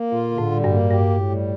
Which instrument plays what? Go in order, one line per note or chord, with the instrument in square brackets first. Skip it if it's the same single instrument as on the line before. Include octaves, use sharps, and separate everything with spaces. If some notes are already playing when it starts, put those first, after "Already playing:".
Already playing: [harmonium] A#3
[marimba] A#2 [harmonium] F4
[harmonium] D3
[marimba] A2
[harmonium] G3
[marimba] G2
[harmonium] A#3
[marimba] G2 [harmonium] G4
[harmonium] A2
G3